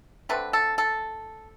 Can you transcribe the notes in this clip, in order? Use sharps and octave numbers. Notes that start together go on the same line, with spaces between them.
D3 A3 C4 B4
A4
A4